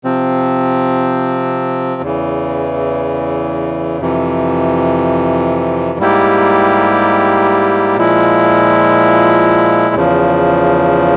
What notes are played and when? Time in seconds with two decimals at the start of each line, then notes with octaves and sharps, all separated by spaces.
0.04 C3 F3 C4
2.02 E2 C#3 E3
4.01 F2 C3 E3
5.99 G#2 G3 A#3 E4 G4
7.97 A#2 F3 G#3 E4
9.95 E2 C#3 F3